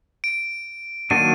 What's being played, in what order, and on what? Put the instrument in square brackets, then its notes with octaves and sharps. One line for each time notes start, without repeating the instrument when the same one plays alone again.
[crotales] D7
[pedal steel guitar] D#3 F#3 A#3 D4 F#4 [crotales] D#7